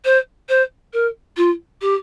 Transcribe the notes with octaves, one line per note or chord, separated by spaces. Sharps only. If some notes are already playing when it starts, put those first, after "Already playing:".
C5
C5
A#4
F4
G4